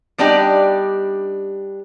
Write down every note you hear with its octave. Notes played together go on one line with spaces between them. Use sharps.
G3 B3 D4 D#4 G4